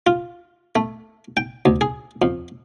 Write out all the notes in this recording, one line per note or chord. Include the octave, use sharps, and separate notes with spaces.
F4
A3
G5
D2
G#4
F2